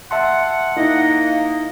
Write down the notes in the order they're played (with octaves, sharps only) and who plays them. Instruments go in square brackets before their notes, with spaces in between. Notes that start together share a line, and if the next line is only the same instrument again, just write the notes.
[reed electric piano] E5 A5 C6 [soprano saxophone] F#5
[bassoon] A#3 [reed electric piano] D#4 E4 [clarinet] D#5